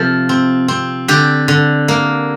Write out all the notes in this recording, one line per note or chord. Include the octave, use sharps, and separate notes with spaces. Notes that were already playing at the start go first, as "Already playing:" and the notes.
Already playing: C3 F3 A4
C4
C4
D3 G4
D3
A#3